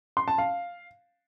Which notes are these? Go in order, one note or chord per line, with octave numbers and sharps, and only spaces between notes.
C6
A5
F5